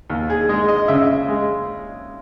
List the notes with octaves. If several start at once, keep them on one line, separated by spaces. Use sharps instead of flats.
D#2
G#4
G#3 D#5
D#5
C#3 E5
G#3